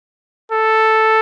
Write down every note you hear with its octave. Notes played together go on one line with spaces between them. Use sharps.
A4